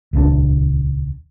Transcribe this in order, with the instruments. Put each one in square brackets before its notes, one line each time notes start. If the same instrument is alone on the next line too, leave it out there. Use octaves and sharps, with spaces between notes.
[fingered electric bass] D#1 C#2 D3 D4